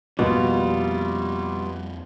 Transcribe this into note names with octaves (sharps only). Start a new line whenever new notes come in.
F2 B2 F3 G3 A#3 F4